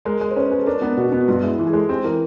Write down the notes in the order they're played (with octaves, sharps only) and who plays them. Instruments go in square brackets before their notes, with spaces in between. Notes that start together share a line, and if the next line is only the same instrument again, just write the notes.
[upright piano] G#3 [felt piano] A#4
[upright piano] G#3
[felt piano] C5
[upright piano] C#4 [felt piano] B4
[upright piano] G#3 [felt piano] G#4
[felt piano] A4
[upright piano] D4 [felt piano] A#4
[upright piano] B3 [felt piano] A#4
[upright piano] B2 [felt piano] F#4
[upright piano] B3
[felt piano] F#4
[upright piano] G2 [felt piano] F4
[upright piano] G#3 [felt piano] E4
[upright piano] E3 [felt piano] F4
[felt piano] G#4
[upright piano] G#3 [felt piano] A4
[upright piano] C4 [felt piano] G4
[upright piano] E3 [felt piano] A#4